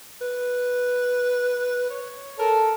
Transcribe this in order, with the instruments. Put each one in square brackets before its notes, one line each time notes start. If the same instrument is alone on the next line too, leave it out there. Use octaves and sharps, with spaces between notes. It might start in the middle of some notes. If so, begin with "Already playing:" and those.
[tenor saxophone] B4
C#5
[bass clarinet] A4 [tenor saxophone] A#4